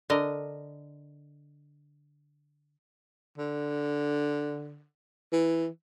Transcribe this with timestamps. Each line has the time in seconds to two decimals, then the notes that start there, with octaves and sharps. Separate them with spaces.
0.10 D3 A#4 D#5
3.38 D3
5.32 E3